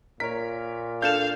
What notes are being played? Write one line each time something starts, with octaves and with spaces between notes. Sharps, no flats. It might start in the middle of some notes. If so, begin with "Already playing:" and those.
A#2 A#4 C#5 B6
D4 A4 F5 G6 E7